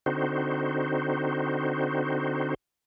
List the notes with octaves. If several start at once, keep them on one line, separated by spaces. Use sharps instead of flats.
D3 C4 D#4 F#4 C5